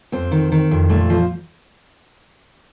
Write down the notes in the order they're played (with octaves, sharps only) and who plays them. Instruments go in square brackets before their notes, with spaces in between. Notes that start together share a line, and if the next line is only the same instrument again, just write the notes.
[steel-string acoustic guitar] F2 C4
D#3
D#3
F2
A#2 A3
F3